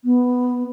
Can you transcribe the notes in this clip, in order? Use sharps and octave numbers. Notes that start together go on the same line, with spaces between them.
B3